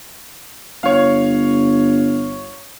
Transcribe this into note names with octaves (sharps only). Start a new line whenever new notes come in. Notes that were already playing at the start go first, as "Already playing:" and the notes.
G1 C#5 F5